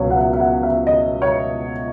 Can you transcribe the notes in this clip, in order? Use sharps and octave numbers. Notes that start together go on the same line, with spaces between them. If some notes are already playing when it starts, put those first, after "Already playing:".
Already playing: C#2 B2 F#3 C#5
F#5
E5
E5
F#5
E5
D#5
C#5